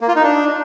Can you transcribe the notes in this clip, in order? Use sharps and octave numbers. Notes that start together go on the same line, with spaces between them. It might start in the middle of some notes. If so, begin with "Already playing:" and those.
A#3
F4
D#4
D4